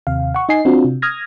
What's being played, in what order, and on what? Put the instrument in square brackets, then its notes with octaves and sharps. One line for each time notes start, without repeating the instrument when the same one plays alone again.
[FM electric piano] D#2 C3 F5
F#5 C#6
D#4 D#5 G#5 C7
C4 D4 F4 F#4
C3
D#6 F6 G#6 A#6